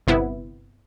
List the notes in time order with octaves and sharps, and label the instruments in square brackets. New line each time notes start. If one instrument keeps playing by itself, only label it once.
[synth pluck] G1 C3 B3 E4